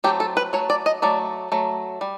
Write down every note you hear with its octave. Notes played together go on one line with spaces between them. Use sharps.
F#3 A3 C4 G4
A4
B4
F#3 A3 C#5
D5
D#5
F#3 A3 D5
F#3 A3
G3